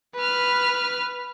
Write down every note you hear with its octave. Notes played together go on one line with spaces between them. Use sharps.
B4 F6